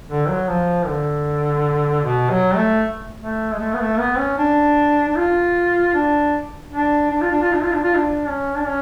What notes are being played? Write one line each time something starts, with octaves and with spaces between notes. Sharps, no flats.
D3
F#3
F3
D3
B2
F#3
A3
A3
G#3
A3
B3
A3
B3
C#4
D4
D4
F4
D4
D4
D4
F4
D4
F4
D4
F4
D4
F4
D4
C#4
D4
C#4